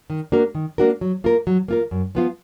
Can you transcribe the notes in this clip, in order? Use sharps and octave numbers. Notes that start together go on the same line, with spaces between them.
D#3
A#3 D4 F#4 A#4
D#3
A#3 D4 F#4 A#4
F#3
A#3 F4 A#4
F#3
A#3 F4 A#4
F#2
F3 B3 F4